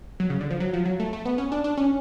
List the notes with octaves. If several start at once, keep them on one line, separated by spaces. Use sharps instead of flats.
F#3
C#3
D3
F3
F#3
F3
F#3
A3
A3
B3
C#4
D4
D4
C#4